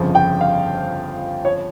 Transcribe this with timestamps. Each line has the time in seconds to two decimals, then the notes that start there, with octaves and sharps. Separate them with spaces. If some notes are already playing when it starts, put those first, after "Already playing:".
Already playing: G1 F2 C#3 F3
0.15 G5
0.41 F5
1.45 C#5